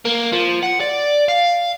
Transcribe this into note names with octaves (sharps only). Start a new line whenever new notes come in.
A#3
F3
F#5
D5
F5